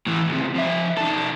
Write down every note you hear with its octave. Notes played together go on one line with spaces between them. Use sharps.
A2 E3
C#2 C3
F3 E5
D#3 A4